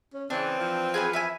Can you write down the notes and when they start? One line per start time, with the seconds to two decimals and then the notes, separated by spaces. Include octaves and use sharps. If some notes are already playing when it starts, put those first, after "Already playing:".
0.13 C#4
0.30 C#3 E3 C4 D4
0.58 E3 F3
0.94 G#4 B4 G#5
1.13 B4 E5 G#5